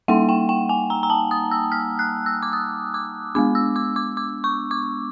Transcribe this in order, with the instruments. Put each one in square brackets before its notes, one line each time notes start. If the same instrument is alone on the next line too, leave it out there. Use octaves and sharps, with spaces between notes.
[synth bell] G3 A#3 D#4 F#5
G5
G5
G#5
A#5
A#5
A5
D#6
E6
F6
F#6
E6
D6
D#6
D6
G#3 B3 D4 D6
E6
D6
D6
D6
C#6
D6